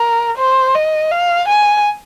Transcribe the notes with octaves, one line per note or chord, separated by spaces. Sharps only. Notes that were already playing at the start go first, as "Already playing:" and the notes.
Already playing: A#4
C5
D#5
F5
G#5